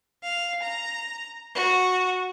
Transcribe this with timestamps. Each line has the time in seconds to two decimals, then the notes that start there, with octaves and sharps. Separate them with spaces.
0.24 F5
0.61 A#5
1.55 F#4